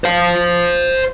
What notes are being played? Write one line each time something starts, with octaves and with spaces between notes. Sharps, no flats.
C5 F5